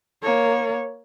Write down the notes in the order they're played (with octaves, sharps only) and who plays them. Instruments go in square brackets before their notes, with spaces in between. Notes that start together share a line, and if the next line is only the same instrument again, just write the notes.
[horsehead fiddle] A#3 C#5